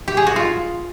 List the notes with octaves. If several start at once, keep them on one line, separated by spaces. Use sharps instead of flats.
G4
G#4
F#4
F4